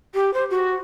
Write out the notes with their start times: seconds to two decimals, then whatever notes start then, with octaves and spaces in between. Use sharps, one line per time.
0.14 G4
0.34 C5
0.50 F#4